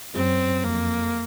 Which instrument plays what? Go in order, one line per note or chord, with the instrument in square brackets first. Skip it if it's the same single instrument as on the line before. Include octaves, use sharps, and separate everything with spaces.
[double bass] F#2 [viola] C4
[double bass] F2 [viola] A#3